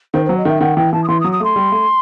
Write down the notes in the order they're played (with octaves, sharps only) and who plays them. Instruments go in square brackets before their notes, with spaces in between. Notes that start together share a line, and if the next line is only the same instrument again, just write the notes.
[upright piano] D#3 [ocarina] C5
[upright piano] F#3 [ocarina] C5
[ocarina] D#5
[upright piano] D#3 [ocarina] E5
[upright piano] D#3 [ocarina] F#5
[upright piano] E3 [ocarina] G5
[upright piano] E3 [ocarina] A5
[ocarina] D#6
[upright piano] E3 [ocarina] C6
[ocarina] D#6
[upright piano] F#3
[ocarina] D#6
[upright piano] A3 [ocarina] C6
[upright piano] G3
A3